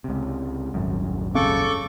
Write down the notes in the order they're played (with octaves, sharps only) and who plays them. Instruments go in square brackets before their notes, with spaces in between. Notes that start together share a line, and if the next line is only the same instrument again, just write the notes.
[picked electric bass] C#2 C3
D#1 G#1 F#2
[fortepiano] C#3 [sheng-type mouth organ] A4 C#6 D6